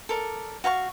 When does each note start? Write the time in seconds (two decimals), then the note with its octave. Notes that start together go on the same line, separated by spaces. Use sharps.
0.09 A4 A#4 D5
0.64 F#4 F5 A5 C#6